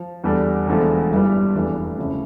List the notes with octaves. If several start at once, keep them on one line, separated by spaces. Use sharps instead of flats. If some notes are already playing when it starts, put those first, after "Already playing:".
Already playing: F3
E2 D3 G3 D4 A4
E1 E2 D3 F3 A3
G1 G2 E3 G3
F1 E2 E3 A3 D4
D2 C#3 F3 C#4 E4